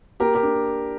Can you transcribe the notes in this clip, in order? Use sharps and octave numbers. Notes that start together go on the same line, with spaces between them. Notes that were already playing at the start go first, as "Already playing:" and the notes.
A#3 G4 A#4
G4 A#4
D4